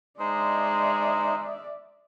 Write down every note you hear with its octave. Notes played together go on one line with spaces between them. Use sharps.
G#3 D#4 C5 D5 E5